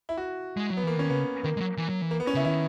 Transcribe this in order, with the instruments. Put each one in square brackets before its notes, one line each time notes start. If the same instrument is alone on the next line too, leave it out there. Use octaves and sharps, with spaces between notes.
[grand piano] E4
F#4
[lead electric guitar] G#3
F#3
[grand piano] B3
[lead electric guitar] E3 [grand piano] A#3
[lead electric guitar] D#3 [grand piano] C#4
[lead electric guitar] C#3 [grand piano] B3
[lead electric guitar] D#3 [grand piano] A#3
[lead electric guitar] G#3
F#3
E3
F#3
E3
[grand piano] A#3
B3
C#4
[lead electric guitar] C#3 [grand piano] E4
[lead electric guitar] D#3 [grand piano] E4